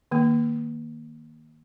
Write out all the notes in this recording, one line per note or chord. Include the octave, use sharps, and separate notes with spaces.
D#3 A#3